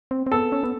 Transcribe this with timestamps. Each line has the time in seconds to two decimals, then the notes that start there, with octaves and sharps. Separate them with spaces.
0.11 C4
0.27 C4
0.32 B3 A4
0.52 C#4
0.63 B3